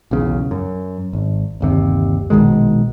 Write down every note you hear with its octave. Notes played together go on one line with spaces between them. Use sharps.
B1 E2 C#3
F#2
G#1
G1 D#2 C3
A#1 B2 D#3 G#3